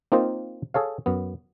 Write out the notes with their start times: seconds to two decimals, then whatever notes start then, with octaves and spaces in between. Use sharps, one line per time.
0.12 A#3 C4 D#4 F4 A#4 C5
0.74 G#4 A4 C#5 F5
1.06 F#2 B3